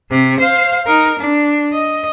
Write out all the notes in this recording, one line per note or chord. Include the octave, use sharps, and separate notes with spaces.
C3
C5 F5
D#4 A#4
D4
D#5